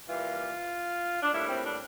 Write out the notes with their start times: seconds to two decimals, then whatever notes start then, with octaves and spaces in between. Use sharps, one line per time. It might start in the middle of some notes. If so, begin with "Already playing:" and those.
0.08 E3 G3 A#3 F4
1.23 D4
1.33 A2 G3 A#3 E4
1.49 C4
1.65 D4